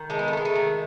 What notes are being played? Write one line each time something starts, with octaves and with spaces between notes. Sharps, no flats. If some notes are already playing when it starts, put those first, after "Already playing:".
Already playing: D#3
G#3 A3
B3
A3
G#3 B3
A3
D#3